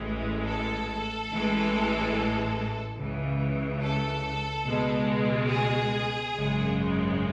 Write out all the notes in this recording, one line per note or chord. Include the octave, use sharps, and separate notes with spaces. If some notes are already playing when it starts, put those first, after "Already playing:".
Already playing: A1 A2 E3 G#3
A4
A1 A2 E3 G#3
C#2 C#3 E3
A4
C#2 B2 G#3
G#4
G#1 F#2 C#3 G#3